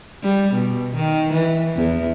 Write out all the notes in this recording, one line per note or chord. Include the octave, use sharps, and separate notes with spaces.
G3
B2
D#3
E3
E2